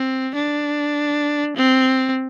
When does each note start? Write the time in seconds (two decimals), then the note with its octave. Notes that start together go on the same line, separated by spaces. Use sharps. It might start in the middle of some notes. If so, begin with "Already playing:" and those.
Already playing: C4
0.35 D4
1.56 C4